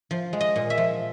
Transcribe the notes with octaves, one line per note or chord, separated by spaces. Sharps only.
F3
G#3
D#5
A#2
E5
F3